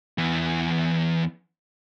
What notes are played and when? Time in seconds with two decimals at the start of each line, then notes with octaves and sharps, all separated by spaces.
0.18 E2 E3